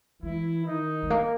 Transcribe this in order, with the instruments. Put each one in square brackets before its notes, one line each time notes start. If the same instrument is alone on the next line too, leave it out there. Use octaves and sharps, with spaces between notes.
[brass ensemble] E3 E4 [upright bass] G#3
[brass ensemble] D#3 D#4
[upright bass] G#3
A#3